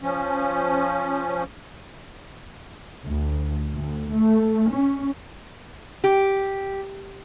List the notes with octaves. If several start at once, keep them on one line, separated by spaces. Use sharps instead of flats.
F3 C#4
D2
D2
A3
C#4
G4